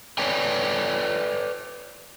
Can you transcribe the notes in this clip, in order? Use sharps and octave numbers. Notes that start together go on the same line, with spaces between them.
A4 B4 C#5 D5 G5 G#5